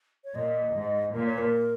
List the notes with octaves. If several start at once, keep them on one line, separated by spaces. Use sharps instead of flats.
C#5
A#2 D#5
G#2
A#2 A#4
C#5
A#4